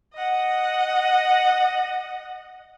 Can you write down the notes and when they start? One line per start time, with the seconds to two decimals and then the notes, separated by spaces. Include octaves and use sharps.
0.14 D#5 F#5